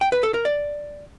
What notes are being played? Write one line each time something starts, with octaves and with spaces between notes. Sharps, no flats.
G5
B4
A4
A#4
D5